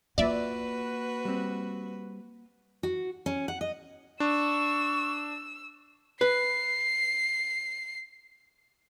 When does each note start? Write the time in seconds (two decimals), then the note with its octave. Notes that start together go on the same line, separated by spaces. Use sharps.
0.18 A#3 F4 F#4 B4 D5 E5
1.25 G3 C4
2.83 F#4
3.26 C#4
3.48 F#5
3.61 D#5
4.20 D4 C#6 E6
6.21 B4 C7